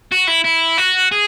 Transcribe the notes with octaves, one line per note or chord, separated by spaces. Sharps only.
F#4
E4
E4
F#4
G#4